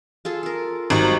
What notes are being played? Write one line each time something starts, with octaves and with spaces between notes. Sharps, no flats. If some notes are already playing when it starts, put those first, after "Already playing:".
F4 G#4 A4
A4 A#4
G#1 F#3 G3 D#4